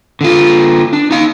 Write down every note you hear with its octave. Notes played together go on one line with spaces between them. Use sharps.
D3 F4
D4
D#4 F5